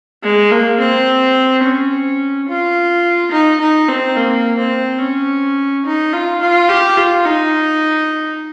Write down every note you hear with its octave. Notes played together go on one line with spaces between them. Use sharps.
G#3
A#3
C4
C#4
F4
D#4
D#4
C4
A#3
C4
C#4
D#4
F4
F4
G4
F4
D#4